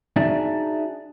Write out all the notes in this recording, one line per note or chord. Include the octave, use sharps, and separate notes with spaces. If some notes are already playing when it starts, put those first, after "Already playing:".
D4 D#4 F#4 G#4 D5 E5